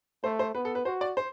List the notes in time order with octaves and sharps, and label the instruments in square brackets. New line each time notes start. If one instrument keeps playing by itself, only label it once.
[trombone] A3 [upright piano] C5
[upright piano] C5
[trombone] B3 [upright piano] B4
[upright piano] A4
B4
[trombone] F#4 [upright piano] C5
[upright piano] D5
C5